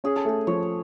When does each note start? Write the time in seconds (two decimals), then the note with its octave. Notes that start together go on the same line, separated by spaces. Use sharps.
0.04 C#4 G#4
0.16 A4
0.25 A3 G#4
0.47 F3 C#5